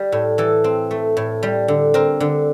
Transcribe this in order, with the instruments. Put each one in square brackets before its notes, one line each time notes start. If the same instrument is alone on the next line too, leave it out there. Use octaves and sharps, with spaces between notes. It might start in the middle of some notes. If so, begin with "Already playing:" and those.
Already playing: [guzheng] G3 A4
A2
E3 A4
C4
A3
A2
G3
D3
C4 A#4
D3